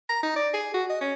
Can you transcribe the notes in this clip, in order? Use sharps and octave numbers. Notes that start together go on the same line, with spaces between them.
A#5
D#4
D5
G#4
F#4
D#5
C#4